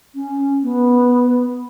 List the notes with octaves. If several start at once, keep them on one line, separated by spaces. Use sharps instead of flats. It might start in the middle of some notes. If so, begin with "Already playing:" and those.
C#4
B3